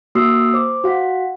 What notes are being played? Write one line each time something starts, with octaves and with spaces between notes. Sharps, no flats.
A#3 F#4 D#6 E6 C7
C5 D6
F#4 F5 F#5 B6